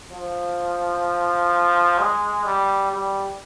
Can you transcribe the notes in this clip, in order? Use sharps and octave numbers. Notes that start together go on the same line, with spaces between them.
F3
G#3
G3
G3